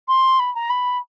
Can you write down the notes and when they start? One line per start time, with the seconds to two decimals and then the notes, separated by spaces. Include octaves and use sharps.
0.08 C6
0.39 B5
0.55 A#5
0.70 B5